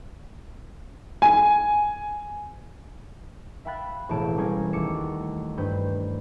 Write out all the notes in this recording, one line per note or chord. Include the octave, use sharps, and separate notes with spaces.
G#5
E5 F5 G5 B5 F#6 A6
E1 A1 A2 C4 A5 D7
G3 A#3 C4 C#4 G#4
D#2 A3 D6 C#7 E7
F#4
G2 B4 C5 G6